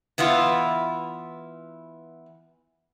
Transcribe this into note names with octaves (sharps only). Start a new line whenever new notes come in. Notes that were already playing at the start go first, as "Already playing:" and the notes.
E3 B3 E4 F4